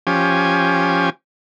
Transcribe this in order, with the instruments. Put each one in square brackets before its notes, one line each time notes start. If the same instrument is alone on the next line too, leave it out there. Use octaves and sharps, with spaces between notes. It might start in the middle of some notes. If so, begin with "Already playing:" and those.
[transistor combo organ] F3 C#4 G4 G#5